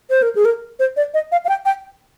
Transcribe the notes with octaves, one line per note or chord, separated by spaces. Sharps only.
C5
A#4
G#4
A#4
C5
D5
D#5
F5
F5
G5
G5